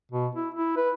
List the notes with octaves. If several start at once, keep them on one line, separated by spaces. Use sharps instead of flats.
B2
E4
E4
B4